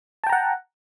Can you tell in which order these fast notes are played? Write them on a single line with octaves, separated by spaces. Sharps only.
A5 G5 A#5 F#5